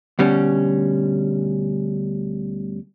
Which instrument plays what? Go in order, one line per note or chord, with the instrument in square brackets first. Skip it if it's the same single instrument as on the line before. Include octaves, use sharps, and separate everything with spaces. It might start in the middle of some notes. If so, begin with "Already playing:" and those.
[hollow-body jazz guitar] D2 B2 G3 C#4